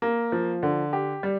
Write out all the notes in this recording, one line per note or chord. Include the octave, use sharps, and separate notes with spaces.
A#3
F3
D3
G4
G3